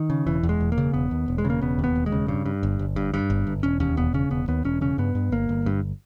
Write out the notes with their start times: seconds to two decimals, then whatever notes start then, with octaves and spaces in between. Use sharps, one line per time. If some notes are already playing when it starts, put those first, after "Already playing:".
Already playing: D#3
0.10 C#3
0.27 E1 E3
0.43 E2
0.49 G#3
0.60 E1
0.72 A#3
0.78 C#3
0.93 E1 B3
1.11 D#2
1.28 E1
1.38 G#3
1.45 C#3
1.50 A#3
1.61 E1 B3
1.79 D#2
1.84 B3
1.96 E1
2.06 G#3
2.12 C#3
2.28 G2
2.45 G2
2.63 G1
2.79 G1
2.96 G2
3.14 G2
3.30 G1
3.47 G1
3.63 E1 C#4
3.80 D#2 C#4
3.97 E1 B3
4.14 C#3 C#4
4.31 E1 B3
4.48 D#2 B3
4.65 E1 C#4
4.81 C#3 C#4
4.98 G2 B3
5.15 G2
5.32 G1 A#3
5.49 G1
5.66 G2